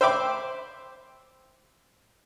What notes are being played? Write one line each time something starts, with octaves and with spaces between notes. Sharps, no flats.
C5 E5 G5 B5 D6